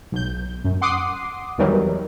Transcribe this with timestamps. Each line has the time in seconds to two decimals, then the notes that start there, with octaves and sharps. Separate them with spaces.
0.12 B1 G6
0.64 F#2
0.81 F#5 C6 D6 D#6 C7
1.58 E2 D#3 E3 F#3 G3